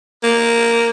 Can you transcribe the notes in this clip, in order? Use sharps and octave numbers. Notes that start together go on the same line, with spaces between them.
A#3